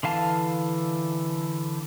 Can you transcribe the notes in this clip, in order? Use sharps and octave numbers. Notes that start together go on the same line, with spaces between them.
D3 E3 F5 A5